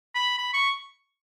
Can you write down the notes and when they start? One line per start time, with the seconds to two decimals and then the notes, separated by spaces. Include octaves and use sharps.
0.15 B5
0.38 B5
0.54 C#6